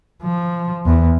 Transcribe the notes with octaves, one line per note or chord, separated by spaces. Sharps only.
F3
E2